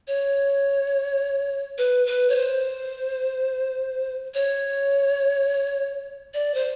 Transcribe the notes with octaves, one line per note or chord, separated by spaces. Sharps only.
C#5
B4
B4
C#5
C5
C#5
D5
C5